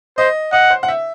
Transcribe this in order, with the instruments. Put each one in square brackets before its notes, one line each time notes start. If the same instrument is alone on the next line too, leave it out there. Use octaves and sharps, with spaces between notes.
[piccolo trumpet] C5 [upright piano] D#5
[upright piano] D#5 [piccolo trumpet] F#5
[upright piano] C5
F#5
E5